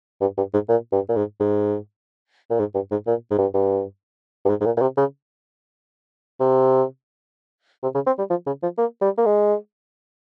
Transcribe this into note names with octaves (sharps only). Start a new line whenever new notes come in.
G2
G2
G#2
A#2
G2
A#2
G#2
G#2
A#2
G#2
G2
G#2
A#2
G#2
G2
G2
G2
G#2
G#2
A#2
A#2
C3
C#3
C3
C3
C#3
C4
G3
F3
C#3
F3
A#3
G3
A#3
G#3